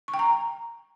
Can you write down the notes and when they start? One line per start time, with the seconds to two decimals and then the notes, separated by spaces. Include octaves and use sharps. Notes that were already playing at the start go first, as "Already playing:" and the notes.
0.08 C#6
0.14 G5
0.19 A#5